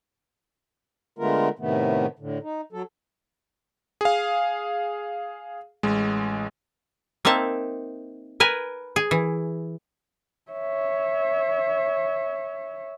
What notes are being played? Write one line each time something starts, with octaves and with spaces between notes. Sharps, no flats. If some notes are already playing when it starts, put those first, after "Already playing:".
D3 G#3 A3 B3 F4 A#4
A2 C3 D#3 A3 B3
A2 D3
D#4
F#3 A4
G#4 F5
A1 G#3
A#3 C4 D#4 E5 A5
A#4 B4 G#5
G#4
E3
C#5 E5